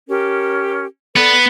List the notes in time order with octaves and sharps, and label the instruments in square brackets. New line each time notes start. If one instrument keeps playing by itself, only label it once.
[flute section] C#4 G4 A#4
[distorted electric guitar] B3 [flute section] A4 B4 D5